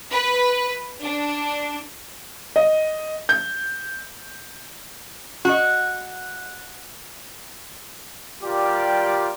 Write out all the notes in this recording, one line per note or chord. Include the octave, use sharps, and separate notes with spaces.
B4
D4
D#5
G6
F#4 D#5
G3 F4 G4 A#4 D5 G5